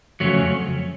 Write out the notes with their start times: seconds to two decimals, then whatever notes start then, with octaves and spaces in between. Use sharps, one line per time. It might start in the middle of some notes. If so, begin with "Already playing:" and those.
0.20 F2 C#3 F#3 A3 C#4